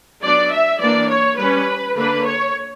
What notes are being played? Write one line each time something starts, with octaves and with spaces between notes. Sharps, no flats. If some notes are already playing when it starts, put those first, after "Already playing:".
F#3 B3 D4 D5
E5
E3 A#3 D4 D5
C#5
G3 C#4 B4
D3 A#3 D4 B4
C#5